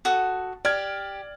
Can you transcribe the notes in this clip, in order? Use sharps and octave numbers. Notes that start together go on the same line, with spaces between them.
F#4 A4 D#6
G4 D5 F6 G#6